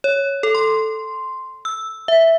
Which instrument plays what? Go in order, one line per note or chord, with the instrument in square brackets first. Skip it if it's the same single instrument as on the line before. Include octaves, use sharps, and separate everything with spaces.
[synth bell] C#5
A4
C6
E6
E5